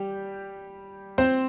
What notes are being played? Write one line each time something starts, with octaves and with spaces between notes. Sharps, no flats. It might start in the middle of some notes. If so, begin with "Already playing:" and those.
Already playing: G3 G4
C4 C5